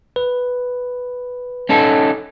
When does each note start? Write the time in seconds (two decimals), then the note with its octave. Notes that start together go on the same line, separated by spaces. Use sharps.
0.16 B4
1.69 C#4 D#4 A4